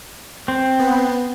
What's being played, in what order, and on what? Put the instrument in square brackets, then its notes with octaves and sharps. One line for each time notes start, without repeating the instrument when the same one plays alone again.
[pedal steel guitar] C4
[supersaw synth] B3